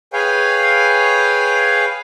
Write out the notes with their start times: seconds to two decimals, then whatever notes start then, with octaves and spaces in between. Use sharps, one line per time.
0.13 G#4 B4 C#5 F5 G5 G#5